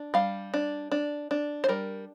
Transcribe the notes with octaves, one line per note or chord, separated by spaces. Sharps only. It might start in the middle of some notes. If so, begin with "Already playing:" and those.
Already playing: D4
G3 F5
D4
D4
D4
C5
G3 A#4